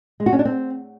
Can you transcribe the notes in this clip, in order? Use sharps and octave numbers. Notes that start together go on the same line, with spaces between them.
G#3
F#4
C#4
D4
C4